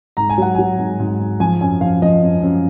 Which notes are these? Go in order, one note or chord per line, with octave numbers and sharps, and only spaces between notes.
G#2 A#5
G#5
F#3 F#5
F#3 G#5
G#2
G#2
G#2
F3 G#5
F#2 G#5
F3 F5
F3 D#5
F#2
F#2